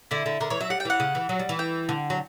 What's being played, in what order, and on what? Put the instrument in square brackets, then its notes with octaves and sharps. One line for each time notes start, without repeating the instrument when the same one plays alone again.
[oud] D3 [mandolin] E4
[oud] D3
[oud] D3 [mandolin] A#4
[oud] E3 [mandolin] C#5
[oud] F#3 [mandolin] E5
[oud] G3 [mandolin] F#5
[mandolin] G5
[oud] E3 [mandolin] F#5
[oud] C#3
E3
F#3
G3
E3
[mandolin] G5
[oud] D3
F#3